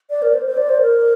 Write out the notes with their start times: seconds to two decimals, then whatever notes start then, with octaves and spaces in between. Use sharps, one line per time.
0.10 D5
0.22 A#4
0.34 C5
0.45 C5
0.57 D5
0.69 C5
0.82 A#4